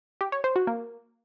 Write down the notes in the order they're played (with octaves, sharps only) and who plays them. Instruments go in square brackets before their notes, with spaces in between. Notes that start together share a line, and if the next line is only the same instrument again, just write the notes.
[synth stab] G4
C#5
C5
F#4
A#3